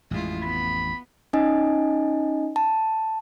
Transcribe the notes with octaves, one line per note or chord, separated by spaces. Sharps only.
A1 F2 G#3 E4 F4
B3 B5
C#4 D#4 D#5 G#5
A5